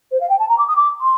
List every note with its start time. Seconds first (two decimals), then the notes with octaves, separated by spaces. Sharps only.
0.11 C5
0.20 F5
0.29 G5
0.39 A5
0.48 A#5
0.58 D6
0.67 D#6
0.76 D6
1.01 C6